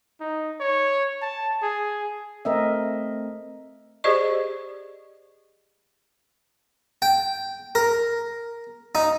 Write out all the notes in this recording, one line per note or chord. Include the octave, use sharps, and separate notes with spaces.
D#4
C#5
A5
G#4
A3 C4 A#4 D#5 E5
G4 G#4 C5 D5 D#5 C#6
G5
A#4
D#4